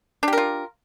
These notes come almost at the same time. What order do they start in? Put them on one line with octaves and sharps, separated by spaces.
D4 G4 A#4 F4